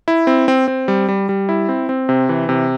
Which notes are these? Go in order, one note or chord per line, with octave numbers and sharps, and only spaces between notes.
E4
C4
C4
C4
G3
G3
G3
E4
C4
C4
C3
E3
C3